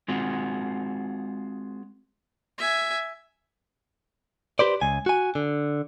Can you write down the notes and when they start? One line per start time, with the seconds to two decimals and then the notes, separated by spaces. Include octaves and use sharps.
0.08 G#3 C4 F4 F#4
2.59 E5 G#5
4.59 G4 B4 C5 D5
4.81 C#2 G#5
5.06 F#4 G#5
5.35 D3